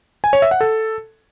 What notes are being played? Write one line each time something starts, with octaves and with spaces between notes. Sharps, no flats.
G#5
C#5
E5
F#5
A4